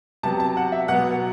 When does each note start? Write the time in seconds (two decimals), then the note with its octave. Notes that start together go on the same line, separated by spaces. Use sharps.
0.23 C3 F#3 B3 A5
0.40 A5
0.57 F#5
0.72 E5
0.88 B2 F#3 B3 F#5